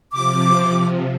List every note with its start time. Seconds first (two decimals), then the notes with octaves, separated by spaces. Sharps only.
0.12 C3 F3 D6